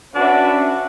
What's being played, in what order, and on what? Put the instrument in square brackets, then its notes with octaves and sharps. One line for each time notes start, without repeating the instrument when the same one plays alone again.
[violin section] C#4 F#4 B4 E5 [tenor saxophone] D4